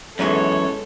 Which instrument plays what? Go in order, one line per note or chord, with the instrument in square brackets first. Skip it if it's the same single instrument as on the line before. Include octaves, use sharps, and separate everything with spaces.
[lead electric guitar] F#2 E3 [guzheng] G#3 B3 D#4 [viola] A4 [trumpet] C#5